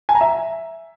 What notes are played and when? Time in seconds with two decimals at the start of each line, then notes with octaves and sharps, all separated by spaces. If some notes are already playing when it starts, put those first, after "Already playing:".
0.09 G#5
0.15 A#5
0.21 E5